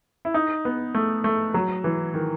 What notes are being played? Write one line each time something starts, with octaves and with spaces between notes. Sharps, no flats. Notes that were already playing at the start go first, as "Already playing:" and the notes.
E4
D#4
B3
A3
A3
F#3
E3
D#3